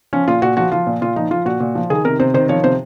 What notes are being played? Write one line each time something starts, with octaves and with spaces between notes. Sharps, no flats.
F3 C#4
A#2 F4
A#2 F#4
F3 F#4
F3 F4
A#2
A#2 F4
F3 D#4
F3 F4
A#2 F#4
A#2
F3
D#3 G#4
C3 A#4
C3 C5
D#3 C5
F3 C#5
C3 C5